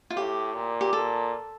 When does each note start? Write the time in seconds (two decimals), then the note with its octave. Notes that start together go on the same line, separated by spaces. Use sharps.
0.10 F4
0.16 A2 G4
0.55 A#2
0.81 G4
0.93 A#2 A4